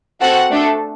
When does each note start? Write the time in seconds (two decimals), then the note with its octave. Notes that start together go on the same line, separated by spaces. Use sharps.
0.20 C4 F#4 A4 F#5
0.51 A3 D4 A4